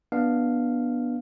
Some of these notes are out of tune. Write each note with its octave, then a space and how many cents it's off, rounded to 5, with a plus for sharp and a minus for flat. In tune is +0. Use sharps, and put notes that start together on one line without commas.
B3 -20 D4 +0 F5 +0